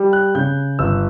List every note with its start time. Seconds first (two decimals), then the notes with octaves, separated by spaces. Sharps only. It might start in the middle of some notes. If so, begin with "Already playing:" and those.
Already playing: G3
0.13 F#6
0.35 C#3 G6
0.79 G1 E6